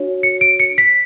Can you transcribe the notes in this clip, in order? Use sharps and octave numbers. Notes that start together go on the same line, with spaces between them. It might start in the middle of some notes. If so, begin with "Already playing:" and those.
Already playing: D4 F#4 C#5
C#7
D7
C#7
B6